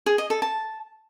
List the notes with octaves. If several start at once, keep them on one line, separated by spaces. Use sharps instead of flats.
G#4
D#5
A4
A5